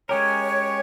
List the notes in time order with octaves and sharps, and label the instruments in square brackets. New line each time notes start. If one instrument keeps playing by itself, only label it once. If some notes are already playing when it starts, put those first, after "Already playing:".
[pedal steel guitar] G#3 C#4 G4 A#4 [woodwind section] C#5